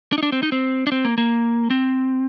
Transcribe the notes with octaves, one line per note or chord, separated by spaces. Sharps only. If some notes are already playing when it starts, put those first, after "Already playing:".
D4
D#4
D4
C4
D#4
C4
D4
C4
A#3
A#3
C4